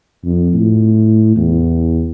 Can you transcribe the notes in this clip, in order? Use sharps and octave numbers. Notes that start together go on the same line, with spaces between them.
F2
A2
E2